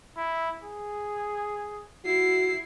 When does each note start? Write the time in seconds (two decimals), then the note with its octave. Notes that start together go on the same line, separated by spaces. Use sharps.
0.17 E4
0.64 G#4
2.05 E4 F#4 C7